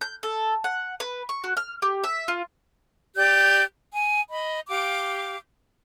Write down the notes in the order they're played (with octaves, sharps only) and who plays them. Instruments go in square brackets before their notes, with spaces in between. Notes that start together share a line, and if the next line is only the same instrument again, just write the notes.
[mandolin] G6
A4
F#5
B4
C#6
F#4
F6
G4
E5
F4
[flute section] G4 D5 G6
G#5
D#5 B5
G4 F5 D6